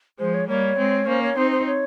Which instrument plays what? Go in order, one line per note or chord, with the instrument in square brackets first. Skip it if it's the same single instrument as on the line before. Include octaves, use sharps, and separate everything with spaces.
[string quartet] F3 G#3 [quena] C5
[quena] C#5
[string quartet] G3 A#3 [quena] C#5
[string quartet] G#3 C4
[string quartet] A#3 C#4 [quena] C5
[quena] C#5
[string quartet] C4 D#4 [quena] C5
[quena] C5
C#5